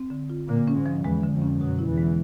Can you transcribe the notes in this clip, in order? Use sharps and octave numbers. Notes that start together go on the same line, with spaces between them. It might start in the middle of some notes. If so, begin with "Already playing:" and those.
Already playing: C4
D3
F4
A#2 D3 A#3
C#4
G#2 G#3
F3
E2 E3 G#3
D3
F2 F3
C#4
F#2 B2 F#3
E4
E2 E3
G#3